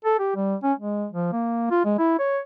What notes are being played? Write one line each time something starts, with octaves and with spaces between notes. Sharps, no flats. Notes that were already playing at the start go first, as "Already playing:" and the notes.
A4
G4
G3
C#4
G#3
F3
A#3
F4
G#3
E4
C#5